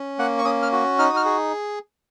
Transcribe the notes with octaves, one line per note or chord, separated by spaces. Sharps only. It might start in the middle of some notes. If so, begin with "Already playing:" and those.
Already playing: C#4
A#3 F#5
C#6
C#4 D#6
F6
F#4
D#4 F6
D#6
F6
G#4